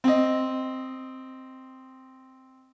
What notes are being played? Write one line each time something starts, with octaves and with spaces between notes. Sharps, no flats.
C4 D#5